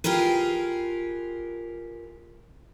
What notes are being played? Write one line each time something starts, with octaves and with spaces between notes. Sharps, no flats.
F4 G4 G#4 A#4 B4